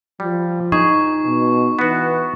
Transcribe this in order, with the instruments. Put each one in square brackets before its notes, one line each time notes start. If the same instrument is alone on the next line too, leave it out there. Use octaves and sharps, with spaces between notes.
[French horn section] F3 [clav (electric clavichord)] G3
[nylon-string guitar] D#4 [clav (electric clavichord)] G#4 [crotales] C#6
[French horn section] B2
[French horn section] E3 B4 [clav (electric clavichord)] B3 F#4